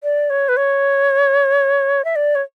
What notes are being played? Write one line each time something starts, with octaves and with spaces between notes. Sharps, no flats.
D5
C#5
B4
C#5
E5
D5
C#5